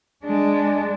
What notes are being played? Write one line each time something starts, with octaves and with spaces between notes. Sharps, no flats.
G#3 D4